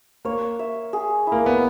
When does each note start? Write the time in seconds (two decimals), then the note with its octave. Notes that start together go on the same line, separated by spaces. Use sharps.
0.25 A#3 C#5
0.59 E5
0.93 G#4
1.27 E4
1.32 A#3
1.46 B3